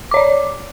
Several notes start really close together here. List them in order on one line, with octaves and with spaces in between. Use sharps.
D6 C#5 D5